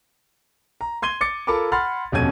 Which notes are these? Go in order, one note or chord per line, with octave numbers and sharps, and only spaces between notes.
A#5
C6 G#6 D#7 G7
D6 A6 C#7
F4 A4 A#4 A5 B5 D6
F#5 B5 C6 F6 A6
D#1 F2 B2 C#4 G#6 D#7